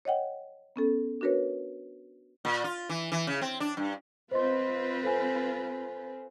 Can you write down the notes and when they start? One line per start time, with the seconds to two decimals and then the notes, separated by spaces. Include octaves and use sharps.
0.05 C#5 D#5 F#5 G5
0.76 B3 C#4 A4
1.21 D4 F#4 A#4 B4 C#5
2.45 A#2
2.64 F4
2.89 E3
3.12 E3
3.27 C#3
3.41 C4
3.60 D4
3.77 G2
4.31 C4 F4 B4 C5 D#5 C6
5.03 A4 C5 G#5